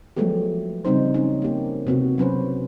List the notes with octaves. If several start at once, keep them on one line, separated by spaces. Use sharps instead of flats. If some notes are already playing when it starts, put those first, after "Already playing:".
F3 F#3 G#3 A3 B3 G4
C#3 G3 C4 D#4 C5
C#4 D#4 G4
A#3 G4
C3 B3 F#4
F#3 C#4 B4 C5